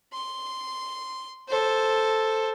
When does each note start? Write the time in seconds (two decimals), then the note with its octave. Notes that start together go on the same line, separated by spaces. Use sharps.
0.13 C6
1.49 A4 C5